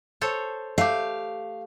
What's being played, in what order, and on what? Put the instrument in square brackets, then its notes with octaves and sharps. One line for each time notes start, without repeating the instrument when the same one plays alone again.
[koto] A4 C5 C#5
[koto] A3 G4 [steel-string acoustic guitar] F5